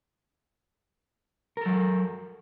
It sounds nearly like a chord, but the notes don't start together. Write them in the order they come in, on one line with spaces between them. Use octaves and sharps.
A#4 A4 F#3